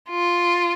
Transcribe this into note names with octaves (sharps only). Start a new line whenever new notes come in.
F4